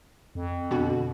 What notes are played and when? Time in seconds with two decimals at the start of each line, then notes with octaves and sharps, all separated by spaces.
0.35 F2
0.71 B2 D3 F#4